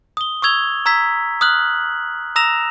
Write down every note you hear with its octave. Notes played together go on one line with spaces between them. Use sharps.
D#6 G7
C#6 D#6 E6 G#6 F7 G7
A#5 E6 G#6 B6
D#6 F6 F#6 F#7
A#5 D#6 E6 A#6 E7 F7